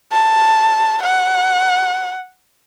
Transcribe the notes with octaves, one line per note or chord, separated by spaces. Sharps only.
A5
F#5